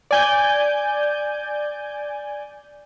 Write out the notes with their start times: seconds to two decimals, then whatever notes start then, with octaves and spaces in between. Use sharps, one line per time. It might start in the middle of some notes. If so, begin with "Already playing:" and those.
0.11 D5 G#5 G6